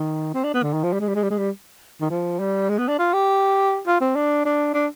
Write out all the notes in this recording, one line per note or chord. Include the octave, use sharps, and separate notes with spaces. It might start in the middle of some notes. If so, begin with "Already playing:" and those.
Already playing: D#3
C4
D4
B3
D3
D#3
F3
G3
G#3
G3
G#3
G3
G#3
G3
D#3
F3
G3
G#3
B3
D4
F4
G4
F4
C4
D4
D4
D4